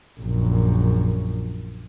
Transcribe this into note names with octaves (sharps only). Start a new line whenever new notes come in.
A#1 F#2